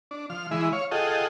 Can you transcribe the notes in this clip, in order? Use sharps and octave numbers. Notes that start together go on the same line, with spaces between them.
D4
F3 F6
E3 G#3 E4
C#5 F5
F4 G#4 A4 D#5 F#5 G5